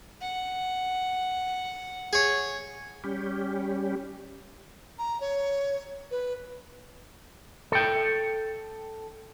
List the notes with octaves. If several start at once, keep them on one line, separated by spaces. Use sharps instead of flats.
F#5
G#4 C#5
G3 C#4 G4
A#5
C#5
B4
A4 G5